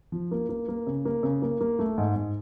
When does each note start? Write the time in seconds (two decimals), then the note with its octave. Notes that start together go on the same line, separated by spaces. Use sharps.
0.12 F3
0.31 A#3
0.49 A#3
0.68 A#3
0.87 C#3
1.05 A#3
1.23 C#3
1.42 A#3
1.61 A#3
1.79 A3
1.98 G#2
2.16 G#2